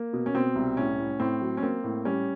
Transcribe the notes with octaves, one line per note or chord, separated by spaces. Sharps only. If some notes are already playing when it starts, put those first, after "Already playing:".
Already playing: A#3
B2
C#4
B2 C4
C2
A2 C#4
A2
A2 C4
F#3
C#4
A#3 C4
A2
G3 C#4